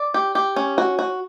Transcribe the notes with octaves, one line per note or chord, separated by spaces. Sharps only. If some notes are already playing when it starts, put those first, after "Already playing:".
Already playing: D5
G4
G4
C#4
F#4
F#4